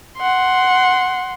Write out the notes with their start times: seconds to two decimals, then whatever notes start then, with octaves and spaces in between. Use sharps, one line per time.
0.18 F#5 C6